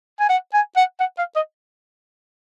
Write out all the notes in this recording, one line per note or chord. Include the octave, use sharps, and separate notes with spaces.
G#5
F#5
G#5
F#5
F#5
F5
D#5